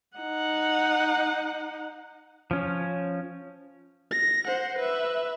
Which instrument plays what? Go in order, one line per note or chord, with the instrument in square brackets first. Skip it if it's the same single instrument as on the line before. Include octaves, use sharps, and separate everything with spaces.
[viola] D#4 F#5
[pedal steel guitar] F3 C#4
[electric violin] A#6
C5 F#5
B4 E5